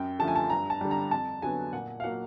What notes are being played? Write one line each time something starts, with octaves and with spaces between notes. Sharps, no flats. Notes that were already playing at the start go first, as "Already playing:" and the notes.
Already playing: F#2 G5
D3 F3 A3 A5
G#5
A5
G2 A#5
A5
D3 G3
A#5
F2 A5
D3 F#3 B3 G#5
A#2 F#5
F5
F#3 A#3 F#5